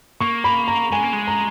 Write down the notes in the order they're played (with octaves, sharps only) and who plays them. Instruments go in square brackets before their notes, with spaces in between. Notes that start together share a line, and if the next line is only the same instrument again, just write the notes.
[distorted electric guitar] A#3 [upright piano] C#6
[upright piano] B5
A#5
[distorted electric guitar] G#3 [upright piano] G#5
[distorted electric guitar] A#3
G#3
[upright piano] A#5